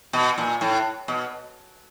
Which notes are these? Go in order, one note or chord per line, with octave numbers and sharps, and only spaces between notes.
B2
A#2
A2
B2